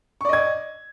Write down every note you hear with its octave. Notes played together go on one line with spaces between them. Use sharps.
D5 D#5 C#6 G#6